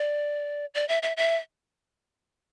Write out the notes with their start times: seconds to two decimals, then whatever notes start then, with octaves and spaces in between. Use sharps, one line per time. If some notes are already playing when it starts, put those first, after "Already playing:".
Already playing: D5
0.74 D5
0.88 E5
1.03 E5
1.17 E5